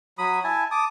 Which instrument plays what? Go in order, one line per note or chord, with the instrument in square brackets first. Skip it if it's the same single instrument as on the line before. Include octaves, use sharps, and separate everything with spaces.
[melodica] F#3 B5 D#6
E4 G#5 A5
A5 D6 D#6